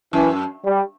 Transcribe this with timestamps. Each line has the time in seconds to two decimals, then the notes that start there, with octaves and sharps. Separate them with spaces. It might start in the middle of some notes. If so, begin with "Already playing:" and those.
0.13 F#2 E3
0.66 G3